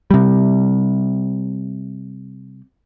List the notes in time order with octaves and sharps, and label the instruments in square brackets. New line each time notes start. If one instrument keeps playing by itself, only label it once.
[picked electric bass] C3 G3